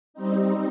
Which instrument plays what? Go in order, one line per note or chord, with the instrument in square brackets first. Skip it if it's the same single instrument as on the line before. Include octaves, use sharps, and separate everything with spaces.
[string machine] G3 C4 D#4